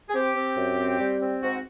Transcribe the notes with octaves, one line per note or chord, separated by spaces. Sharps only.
G#4
C4 G4
C4
F#2
C4
G3
C4
G#2 F#4